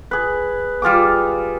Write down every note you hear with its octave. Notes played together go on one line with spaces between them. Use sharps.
G#4 B4
G3 F4 G#4 D6